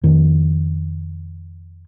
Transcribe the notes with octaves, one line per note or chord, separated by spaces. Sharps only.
F2 D#3